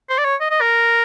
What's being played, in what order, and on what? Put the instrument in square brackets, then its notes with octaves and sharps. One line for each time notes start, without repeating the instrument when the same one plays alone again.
[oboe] C5
D5
C#5
D#5
D#5
A#4